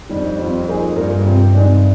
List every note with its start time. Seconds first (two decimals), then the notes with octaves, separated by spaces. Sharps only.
0.09 F2 D#3 G3 D4
0.39 G3 C4 F4
0.68 F3 A#3 D#4 G#4
0.96 G2 G3 A#3 D4 F4 A#4
1.25 C3 F3 C4 G4
1.54 G2 C3 D#3 G#3 D4